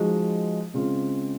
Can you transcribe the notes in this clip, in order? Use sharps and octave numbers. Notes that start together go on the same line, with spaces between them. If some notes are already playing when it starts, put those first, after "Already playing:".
Already playing: F3 G#3 D#4 F#4
C#3 G#3 C4 F4